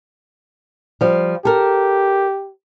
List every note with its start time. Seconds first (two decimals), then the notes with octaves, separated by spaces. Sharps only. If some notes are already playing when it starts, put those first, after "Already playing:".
1.01 F3 G3
1.45 G4 A4 A#4